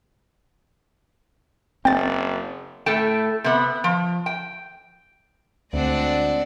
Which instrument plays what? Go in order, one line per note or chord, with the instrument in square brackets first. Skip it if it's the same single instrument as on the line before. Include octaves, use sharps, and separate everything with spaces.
[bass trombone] F#1 [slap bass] C4 [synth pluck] G5 A6
[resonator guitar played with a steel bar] A2 A3 A4 G5
C3 B3
F3
G5
[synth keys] D2 [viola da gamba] G#3 C4 D4 [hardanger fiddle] D5 F#5